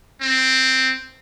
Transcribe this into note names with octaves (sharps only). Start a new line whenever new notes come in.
C4